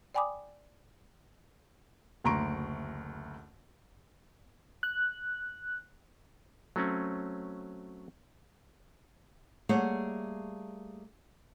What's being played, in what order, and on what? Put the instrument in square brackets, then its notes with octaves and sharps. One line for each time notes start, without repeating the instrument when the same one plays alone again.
[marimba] D5 G5 G#5 B5 D6 D#6
[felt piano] F#1 D2 A#5 C6 C#6 D7
[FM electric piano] F#6
[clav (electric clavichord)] F#3 A3 C4 C#4
[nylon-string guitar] G3 A3 A#3 G#4 C#5 F#5